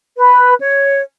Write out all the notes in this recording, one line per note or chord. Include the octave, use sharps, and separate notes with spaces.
B4
C#5